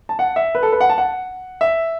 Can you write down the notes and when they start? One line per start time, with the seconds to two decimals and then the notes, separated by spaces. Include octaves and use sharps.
0.09 A5
0.19 F#5
0.36 E5
0.55 B4
0.63 A4
0.72 B4
0.81 F#5
0.90 A5
0.98 F#5
1.61 E5